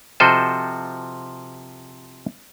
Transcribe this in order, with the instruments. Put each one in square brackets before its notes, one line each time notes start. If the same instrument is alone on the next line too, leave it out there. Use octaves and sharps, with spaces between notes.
[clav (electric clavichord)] C3 F3 F#4 A4 C5 D#5